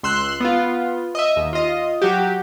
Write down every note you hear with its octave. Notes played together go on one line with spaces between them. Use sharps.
C#2 C6 E6 F#6
B3 F4
D#5 E5
D#2
F4 D#5
F#3 F#4 G4